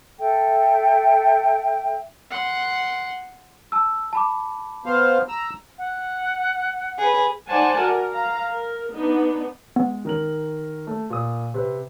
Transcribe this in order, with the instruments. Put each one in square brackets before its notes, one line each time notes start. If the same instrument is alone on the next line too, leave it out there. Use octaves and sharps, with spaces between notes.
[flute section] A4 E5 G5
[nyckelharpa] F#5 C6
[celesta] A5 E6
A5 B5 D6
[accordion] B3 C5 F5
A#5 E6
[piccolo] F#5
[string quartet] G#4 B4
[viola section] D#4 C5 D5 F#5 G#5 A5
F#4 A#4
F5 A#5
A#4
B3 D4 D#4
[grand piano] G#3 [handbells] B3
[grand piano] D#3 A#4 F#7
A3
A#2 D#6
C3 B4